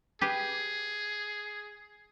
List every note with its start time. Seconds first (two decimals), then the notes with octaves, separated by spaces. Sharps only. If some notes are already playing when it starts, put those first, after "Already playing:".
0.21 G4 G#4 B4